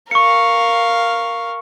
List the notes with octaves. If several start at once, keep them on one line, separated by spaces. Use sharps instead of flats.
A#4 F5 C#6 C#7